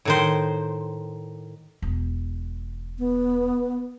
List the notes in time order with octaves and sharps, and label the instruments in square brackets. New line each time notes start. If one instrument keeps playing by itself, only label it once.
[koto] A2 D#3 C5
[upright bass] E1
[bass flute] B3